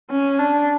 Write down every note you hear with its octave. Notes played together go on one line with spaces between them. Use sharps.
C#4
D4